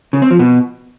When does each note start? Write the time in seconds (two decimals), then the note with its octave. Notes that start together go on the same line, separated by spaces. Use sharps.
0.13 C#3
0.22 C4
0.31 F3
0.39 B2